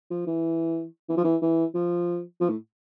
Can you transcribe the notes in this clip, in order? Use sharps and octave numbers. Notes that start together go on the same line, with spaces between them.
F3
E3
E3
F3
E3
E3
F3
F3
A2